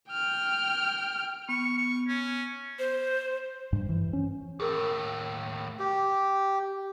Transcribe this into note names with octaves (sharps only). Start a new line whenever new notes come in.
G5 F6
B3 C#6
C#6
C#4
C5
G2
E3
C#4
D#2 A2 G#4 A#4 E6
G4